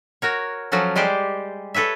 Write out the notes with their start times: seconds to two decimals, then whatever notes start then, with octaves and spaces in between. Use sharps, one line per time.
0.22 F#4 A#4 C#5
0.72 F3 F#3 C#4 F#4 A4
0.96 G3 G#3 G4 C5 D5
1.74 A4 B4 C#5 E5